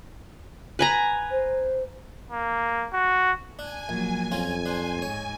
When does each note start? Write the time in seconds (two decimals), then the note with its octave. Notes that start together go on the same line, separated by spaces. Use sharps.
0.79 B4 G#5 A#5
1.30 C5
2.31 A#3
2.93 F#4
3.59 D4 G#5
3.89 A#1 F#3
4.32 F2 C#4 F4 A#5
4.66 D4 C5
5.02 G#2 C#5